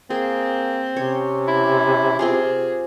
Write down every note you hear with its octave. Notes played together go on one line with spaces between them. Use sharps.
A#3 C4 G#4
C3 C#4 C#5
E4
C4 F4 G4 G#4